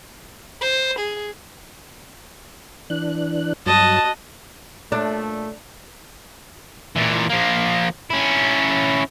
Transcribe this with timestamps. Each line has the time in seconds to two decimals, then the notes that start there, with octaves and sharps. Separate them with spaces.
0.61 C5
0.99 G#4
2.90 E3 D4 F#6
3.66 G2 F#3 F#4 D#5 A5
4.92 A#2 A3 D4
6.96 A#2 E3
7.29 F3 A#3
8.10 C#4 E4